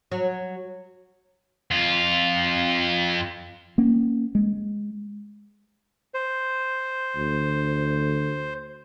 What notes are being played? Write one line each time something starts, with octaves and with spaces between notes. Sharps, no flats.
F#3
F2 F4
A#3 C#4
G#3
C5
D2